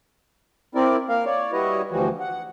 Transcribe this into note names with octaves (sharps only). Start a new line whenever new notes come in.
C4 E4 A#4 D5
A#3 A#4 F5
C#5 D5
G3 E4 F#4 B4 C#5 D#5
D2 E3 F3 G3 F#4
F#5